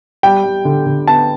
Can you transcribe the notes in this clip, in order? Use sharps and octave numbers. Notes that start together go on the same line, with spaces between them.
G3 G5
G3
D3
D3
B3 A5